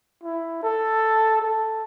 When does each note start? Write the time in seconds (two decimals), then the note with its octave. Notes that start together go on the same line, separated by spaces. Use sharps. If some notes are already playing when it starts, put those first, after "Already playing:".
0.23 E4
0.63 A4
1.42 A4